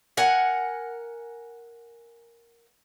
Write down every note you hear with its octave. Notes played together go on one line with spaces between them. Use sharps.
A#4 F#5 G#5